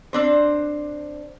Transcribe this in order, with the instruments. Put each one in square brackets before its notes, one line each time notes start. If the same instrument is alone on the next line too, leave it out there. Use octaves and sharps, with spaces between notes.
[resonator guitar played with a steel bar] C4 D4 C5